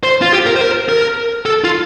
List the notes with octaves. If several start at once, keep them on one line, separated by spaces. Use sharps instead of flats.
C5
F4
G4
A#4
C5
A#4
A#4
A4
F4